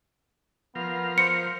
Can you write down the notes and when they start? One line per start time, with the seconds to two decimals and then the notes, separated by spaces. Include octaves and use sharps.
0.75 F3 B3 A#4 F5
1.18 C5 C#7